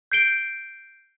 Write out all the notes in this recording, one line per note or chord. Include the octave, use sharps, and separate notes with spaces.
G6 C7 D7 G7